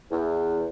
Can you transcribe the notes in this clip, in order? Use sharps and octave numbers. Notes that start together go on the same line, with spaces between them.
E2